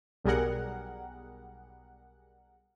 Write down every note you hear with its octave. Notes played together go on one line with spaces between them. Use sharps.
B1 G3 G#4 A#4 F#5